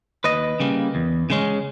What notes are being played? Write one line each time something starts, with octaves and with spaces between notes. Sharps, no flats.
D#2 B4 D#5
C#3 G3 A#3
E2
C#3 G#3 C#4